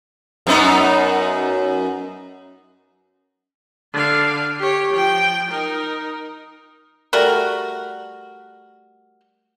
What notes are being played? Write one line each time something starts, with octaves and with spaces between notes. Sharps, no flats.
F#2 B3 D#4
D3 F5
G4 C#5
F3 G5
D#4 A#4
G3 A3 F#4 A#4